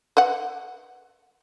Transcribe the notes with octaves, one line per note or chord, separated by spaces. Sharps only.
B4 D#5 F#5